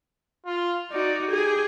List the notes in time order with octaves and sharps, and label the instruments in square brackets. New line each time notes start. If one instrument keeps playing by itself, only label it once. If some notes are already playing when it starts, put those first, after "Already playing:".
[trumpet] F4
[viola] D#4 F#4 [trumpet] D5
[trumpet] G4 [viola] G#4